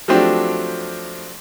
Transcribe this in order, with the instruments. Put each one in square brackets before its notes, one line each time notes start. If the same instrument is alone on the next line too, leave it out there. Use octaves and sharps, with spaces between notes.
[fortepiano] F3 F#3 A3 C4 D4 G4